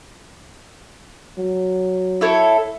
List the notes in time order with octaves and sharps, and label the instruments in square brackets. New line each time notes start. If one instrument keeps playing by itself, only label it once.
[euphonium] F#3
[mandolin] E4 A4 C#5